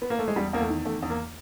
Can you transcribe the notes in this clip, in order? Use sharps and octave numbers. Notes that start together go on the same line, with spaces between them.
B3
A#3
A3
G#3
E2 G3
E2 A#3
A3
D#3
E2 A3
E2
A#3